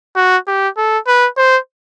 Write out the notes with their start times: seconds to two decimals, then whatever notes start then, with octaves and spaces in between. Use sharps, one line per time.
0.16 F#4
0.47 G4
0.77 A4
1.07 B4
1.38 C5